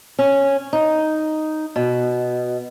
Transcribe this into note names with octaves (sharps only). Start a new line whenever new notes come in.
C#4
D#4
B2